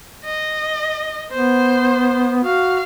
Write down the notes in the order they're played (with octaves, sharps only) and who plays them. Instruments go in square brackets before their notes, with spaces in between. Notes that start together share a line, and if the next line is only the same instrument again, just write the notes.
[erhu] D#5
[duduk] B3 [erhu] C5
[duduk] F#4 [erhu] F5